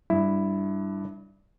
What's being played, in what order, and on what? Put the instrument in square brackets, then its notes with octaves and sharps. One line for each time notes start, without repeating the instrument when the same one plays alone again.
[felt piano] G2 [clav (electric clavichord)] E4